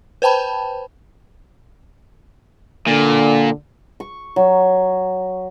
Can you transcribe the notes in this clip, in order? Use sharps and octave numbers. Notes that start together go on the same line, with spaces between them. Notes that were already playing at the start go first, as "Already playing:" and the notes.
B4 C5 G5 A5 B5
A#2 D3
C#6
F#3